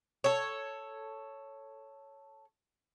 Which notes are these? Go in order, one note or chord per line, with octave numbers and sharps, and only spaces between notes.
A4 C#5